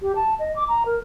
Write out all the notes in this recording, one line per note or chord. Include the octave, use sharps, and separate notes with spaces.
G4
A5
D#5
D6
A#5
A#4